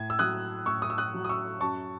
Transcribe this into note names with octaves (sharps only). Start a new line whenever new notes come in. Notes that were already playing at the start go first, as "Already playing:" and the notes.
Already playing: A2 G#6
E6
F#3 D#6 F#6
A2 C#6 E6
D#6
E6
D#6 F#6
F#3
D#6
C#6 E6
F#2 A5 C#6